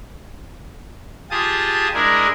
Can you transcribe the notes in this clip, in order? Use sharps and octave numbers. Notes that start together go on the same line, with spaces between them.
F4 G4 G#4 A5 D#6
G#3 D4 E4 G#4 A#4